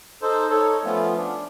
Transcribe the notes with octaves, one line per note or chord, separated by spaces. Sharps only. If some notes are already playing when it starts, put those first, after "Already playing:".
D#4 A4 C5
D#4 A4 C#5
F3 A3 B3 C#4 F4
D4